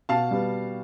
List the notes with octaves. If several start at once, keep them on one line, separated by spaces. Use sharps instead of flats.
B2 F5 A5
G3 B3